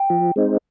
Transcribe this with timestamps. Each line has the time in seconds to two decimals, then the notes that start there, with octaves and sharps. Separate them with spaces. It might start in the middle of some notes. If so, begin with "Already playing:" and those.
Already playing: G5
0.10 F3
0.36 G#3 C4 D#4